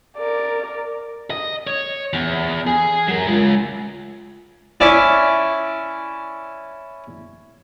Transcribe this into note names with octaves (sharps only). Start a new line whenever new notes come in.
A#4 D5
D#5
C#5
E2
G#4
F#3 A#4
G#3 F4
C#4 E4 D5